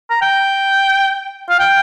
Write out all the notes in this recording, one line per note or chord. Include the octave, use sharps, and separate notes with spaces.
A#5
G5
F5
G5